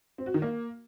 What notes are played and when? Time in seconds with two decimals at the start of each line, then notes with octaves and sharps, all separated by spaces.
0.18 C4
0.26 F#4
0.34 D#3
0.42 A#3